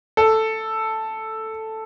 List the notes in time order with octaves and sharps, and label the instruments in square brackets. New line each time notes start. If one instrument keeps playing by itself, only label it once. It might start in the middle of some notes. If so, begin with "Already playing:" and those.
[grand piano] A4